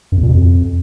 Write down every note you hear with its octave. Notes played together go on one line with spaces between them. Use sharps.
F#2
E2
A#2
B2
F2